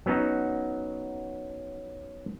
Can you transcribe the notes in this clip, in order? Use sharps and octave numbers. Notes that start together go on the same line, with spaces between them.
F#3 B3 C#4 D#4 F#4